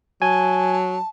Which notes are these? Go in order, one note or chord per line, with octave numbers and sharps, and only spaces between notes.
F#3 G#5 A5